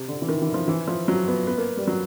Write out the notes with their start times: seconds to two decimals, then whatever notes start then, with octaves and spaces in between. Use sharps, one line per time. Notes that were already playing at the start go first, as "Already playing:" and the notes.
Already playing: C3
0.08 D3
0.22 E3
0.28 D#3
0.41 E3
0.54 F3
0.68 E3
0.88 F3
1.08 F#3
1.28 B3
1.47 B3
1.58 A#3
1.77 G3
1.87 F#3